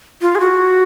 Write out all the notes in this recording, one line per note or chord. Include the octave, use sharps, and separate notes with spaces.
F4
G#4
F#4